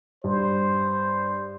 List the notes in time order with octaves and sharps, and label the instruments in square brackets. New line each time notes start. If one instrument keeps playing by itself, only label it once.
[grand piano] G2 [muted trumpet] C5